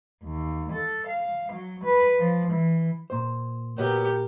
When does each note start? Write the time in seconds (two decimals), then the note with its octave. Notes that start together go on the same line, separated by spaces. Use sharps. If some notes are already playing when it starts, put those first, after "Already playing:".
0.23 D#2
0.72 A4
1.07 F5
1.53 F#3
1.84 B4
2.19 F3
2.52 E3
3.10 A#2 C5
3.78 A#2 F#3 B3 G4 A#4